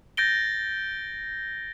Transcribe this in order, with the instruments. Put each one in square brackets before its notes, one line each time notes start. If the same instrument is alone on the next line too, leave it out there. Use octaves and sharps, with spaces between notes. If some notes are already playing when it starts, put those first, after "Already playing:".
[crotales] G6 A6 A#6 D7 G7